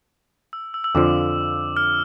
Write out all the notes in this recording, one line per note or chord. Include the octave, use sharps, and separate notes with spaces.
E6
E6
E6
F2 D3 F3 D6
F6